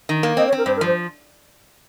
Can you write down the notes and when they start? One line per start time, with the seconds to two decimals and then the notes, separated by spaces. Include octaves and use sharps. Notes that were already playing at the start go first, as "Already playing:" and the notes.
0.09 D#3
0.23 A#3
0.37 C4 D#5
0.47 C#5
0.52 C4 A#4
0.66 G2 C5
0.76 A#4
0.81 F3
0.86 C5